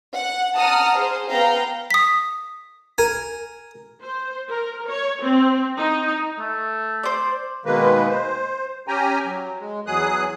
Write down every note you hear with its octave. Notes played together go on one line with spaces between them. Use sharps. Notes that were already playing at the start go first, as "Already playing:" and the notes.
F#5
F#5 A5 A#5 D#6 F6
G#4 C5
B3 F5 G5 A#5
D#6 B6
A#4 G#5
C5
A#4
C#5
C4
D#4
A3
C5 D5
B2 D#3 G#3 A#3 B4
C5
C#4 G4 G5 G#5 A#5
F#3
G#3
E2 F#3 G#4 D#6 F#6